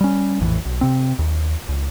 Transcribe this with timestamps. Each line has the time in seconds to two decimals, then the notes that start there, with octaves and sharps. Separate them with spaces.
0.01 G3 C#4
0.41 A#1 F2 A2 E3
0.65 B1
0.81 C3 C4
1.19 D#2
1.69 C#2